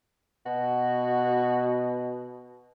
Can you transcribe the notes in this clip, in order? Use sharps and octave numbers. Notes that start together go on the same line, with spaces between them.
B2 F#4